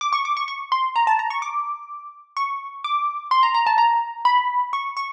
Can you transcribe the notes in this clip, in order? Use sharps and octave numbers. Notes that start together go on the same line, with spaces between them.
D6
C#6
D6
C#6
C#6
C6
A#5
A5
A#5
C#6
D6
C#6
D6
C6
A#5
A#5
A5
A#5
B5
C#6
C#6